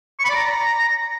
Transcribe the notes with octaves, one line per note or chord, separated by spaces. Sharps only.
C#6
B5
D5
A#5